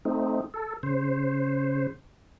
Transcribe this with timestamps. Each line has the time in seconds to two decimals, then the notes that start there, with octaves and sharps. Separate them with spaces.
0.05 A3 C4 D#4
0.54 A4
0.83 C#3 C5